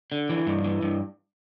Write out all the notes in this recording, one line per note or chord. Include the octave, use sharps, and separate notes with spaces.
D3
E3
G2
E3
G2